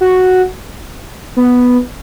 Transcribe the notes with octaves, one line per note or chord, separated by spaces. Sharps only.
F#4
B3